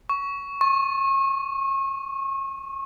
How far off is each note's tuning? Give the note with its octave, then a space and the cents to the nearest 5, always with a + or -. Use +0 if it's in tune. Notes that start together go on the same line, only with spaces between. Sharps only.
C#6 +15
C#6 -35